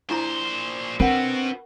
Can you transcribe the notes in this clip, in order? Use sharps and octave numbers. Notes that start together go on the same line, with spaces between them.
A#2 D4 E4 C5 A#5
C4 D4 F#4 A#4 B4 F#5